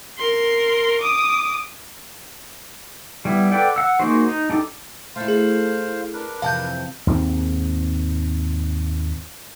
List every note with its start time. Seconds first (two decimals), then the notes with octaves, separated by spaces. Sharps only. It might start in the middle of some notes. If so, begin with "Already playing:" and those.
0.18 A#4 C6
1.01 D6 D#6
3.25 G3 B3 E4
3.52 A4 B4 D5 F#5 G5
3.76 F#5 E6
4.00 G#3 A#3 D#4 F#4 C5
4.26 D#4
4.50 D4 D#4 G4 A4
5.16 A3 E4 C5 F5 C6
5.28 G#4
6.13 D4 A#4 B4
6.42 F2 C3 E3 F5 A5 G6
7.07 D#2 G#2 A3 C4